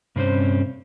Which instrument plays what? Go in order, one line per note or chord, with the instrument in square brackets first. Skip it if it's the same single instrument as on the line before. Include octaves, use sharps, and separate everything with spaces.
[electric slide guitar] G2 C3 C4 C#4 C5